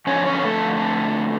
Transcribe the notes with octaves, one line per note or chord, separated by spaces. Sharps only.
F2 D3 F3 C#4 C#5
C#4 C#5
A3 A4